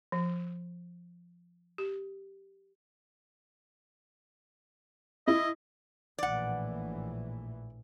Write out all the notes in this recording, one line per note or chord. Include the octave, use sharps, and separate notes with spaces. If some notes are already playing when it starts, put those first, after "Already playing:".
F3
G4
E4 D#5
A#1 A2 E3 D5 F#5